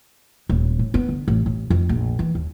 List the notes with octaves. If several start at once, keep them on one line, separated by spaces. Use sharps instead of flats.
D#1
A2
B3
D3
A1
A1
F2
A#1
E3
D#2